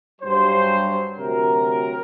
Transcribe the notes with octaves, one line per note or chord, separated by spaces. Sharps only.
G2 F#3 C5
D2 C3 F#3 A#4